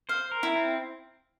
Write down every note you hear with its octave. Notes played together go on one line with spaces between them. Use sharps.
C5 F5
A#4
E4
C4